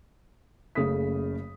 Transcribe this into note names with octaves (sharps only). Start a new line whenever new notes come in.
F#1 C#3 A3 D#6 B6